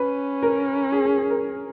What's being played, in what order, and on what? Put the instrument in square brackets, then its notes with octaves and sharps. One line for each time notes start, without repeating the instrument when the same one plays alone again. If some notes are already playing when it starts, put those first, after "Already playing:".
Already playing: [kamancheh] C#4 [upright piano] B4
[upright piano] A#4
G#4
G#4
G#4
A#4